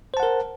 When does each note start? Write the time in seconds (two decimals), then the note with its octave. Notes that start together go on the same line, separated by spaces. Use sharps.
0.14 C5
0.17 A5
0.20 F#5
0.23 A#4